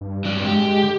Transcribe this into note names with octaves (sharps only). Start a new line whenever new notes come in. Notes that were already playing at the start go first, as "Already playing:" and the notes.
G2
F#3 D4
G#3 G4
D3